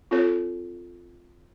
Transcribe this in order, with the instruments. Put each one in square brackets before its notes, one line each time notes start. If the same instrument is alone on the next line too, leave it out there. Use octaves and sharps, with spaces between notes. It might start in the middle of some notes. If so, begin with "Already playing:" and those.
[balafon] C4 F4 A4 C#5